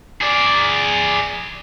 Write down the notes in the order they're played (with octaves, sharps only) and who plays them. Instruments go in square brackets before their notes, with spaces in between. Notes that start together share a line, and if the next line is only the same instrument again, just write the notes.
[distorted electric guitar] G#4 D5